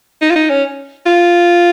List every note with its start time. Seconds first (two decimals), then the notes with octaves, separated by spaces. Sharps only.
0.22 D#4
0.31 F4
0.36 D#4
0.50 C#4
1.06 F4